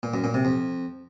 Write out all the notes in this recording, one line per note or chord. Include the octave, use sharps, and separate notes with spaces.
A#2
F#2
A#2
C3
F2